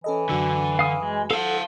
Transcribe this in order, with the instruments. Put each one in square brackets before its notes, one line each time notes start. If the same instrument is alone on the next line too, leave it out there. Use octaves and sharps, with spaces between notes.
[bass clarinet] E3 [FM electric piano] C#4 A4 D#5
[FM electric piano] F#2 F#4 E6 [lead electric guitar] D3
[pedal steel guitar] F5 D#6
G#3
[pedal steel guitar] A4 F#5 [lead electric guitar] F5 A5